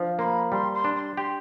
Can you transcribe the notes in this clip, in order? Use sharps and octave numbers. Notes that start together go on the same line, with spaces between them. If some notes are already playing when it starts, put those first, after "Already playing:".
Already playing: F3 D4
A#3 C6
B5
G3 C6
C6
D4
C6
G4 C6